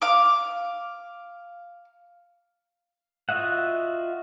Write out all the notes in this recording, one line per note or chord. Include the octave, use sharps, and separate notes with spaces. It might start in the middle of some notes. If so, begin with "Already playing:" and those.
F5 D6
F4 F#4 D#5 E5 F#5